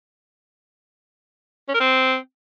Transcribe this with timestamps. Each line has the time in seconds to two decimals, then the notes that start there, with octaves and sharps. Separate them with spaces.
1.68 C#4
1.74 A#4
1.80 C4